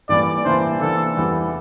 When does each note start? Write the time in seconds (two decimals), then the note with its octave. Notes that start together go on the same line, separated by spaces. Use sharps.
0.09 A2 E3 G3 A#3 D5
0.45 C3 E3 A#3 D4 C5
0.81 C3 E3 A#3 D4 A4
1.17 E2 E3 G3